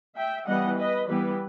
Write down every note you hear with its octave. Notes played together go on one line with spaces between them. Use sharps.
E5 G5
E3 G3 B3 D#5 F#5
B4 D#5
E3 G3 B3 G4 B4